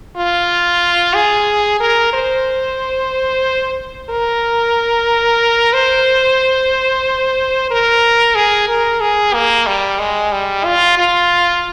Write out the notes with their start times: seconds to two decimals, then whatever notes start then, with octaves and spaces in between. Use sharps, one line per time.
0.17 F4
1.15 G#4
1.80 A#4
2.13 C5
4.10 A#4
5.73 C5
7.71 A#4
8.35 G#4
8.68 A#4
9.01 G#4
9.34 A#3
9.67 G3
9.99 G#3
10.32 G3
10.65 F4
10.98 F4